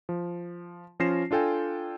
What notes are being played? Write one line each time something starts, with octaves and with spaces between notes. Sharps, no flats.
F3
F3 C#4 F4 A#6 C7 E7
D4 F4 A4 G5 G#5